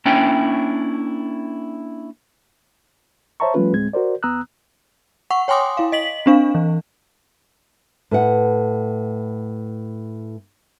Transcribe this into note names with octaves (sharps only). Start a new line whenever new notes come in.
A#3 C#4 D4 E4 C#5 G5
C5 C#5 E5 A5 A#5 C#6
F3 G3 A3 C#4 F4 B4
D2 A2 G#3 C4 G#6
F#4 A#4 C5 D5
E2 B3 A#5 D#6 E6 F#6
F#5 C#6
C#5 G5 G#5 C6 D6 D#6
E4 F5
D#5 B6 F#7
C4 D4 F5
E3
A2 B4 F#5